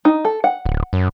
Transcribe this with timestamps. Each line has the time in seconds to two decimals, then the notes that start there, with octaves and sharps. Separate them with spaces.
0.05 D#4
0.25 A4
0.44 F#5
0.66 D1
0.93 F#2